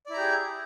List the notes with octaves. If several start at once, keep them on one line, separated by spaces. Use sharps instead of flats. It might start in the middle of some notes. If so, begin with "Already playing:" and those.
E4 G4 G#4 D5 A#5